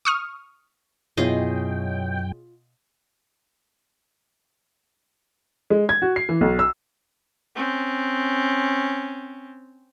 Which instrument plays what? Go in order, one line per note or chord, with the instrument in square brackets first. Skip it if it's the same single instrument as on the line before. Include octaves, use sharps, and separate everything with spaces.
[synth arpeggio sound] C#6 D#6 F6
[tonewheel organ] F#2 G5 [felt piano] B2 E4 C#5 [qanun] F4 G#4 D#5
[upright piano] G#3
G#6
F#4
C7
E3
B1
E6
[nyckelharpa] C4 C#4